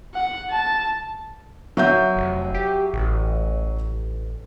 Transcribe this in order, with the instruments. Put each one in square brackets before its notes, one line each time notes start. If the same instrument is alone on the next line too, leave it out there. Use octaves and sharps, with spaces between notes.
[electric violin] F#5
A5
[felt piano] F#3 E5 G6
[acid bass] F1
G4
A1